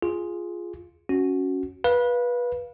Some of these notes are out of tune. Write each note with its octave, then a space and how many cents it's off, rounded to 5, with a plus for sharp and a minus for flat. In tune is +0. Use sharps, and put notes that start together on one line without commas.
F4 +0 G#4 +0
C#4 +0 F#4 +0
B4 -20 F5 +0